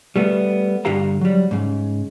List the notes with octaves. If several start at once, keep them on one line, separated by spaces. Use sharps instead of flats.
G3 A3 B3
G2 D3 G4 F5 A#5
F#3 G3
G#2 C#3